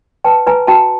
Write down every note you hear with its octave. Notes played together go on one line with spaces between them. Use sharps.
B4 G5 A5
B4 G#5 A#5
F#4 G5 A5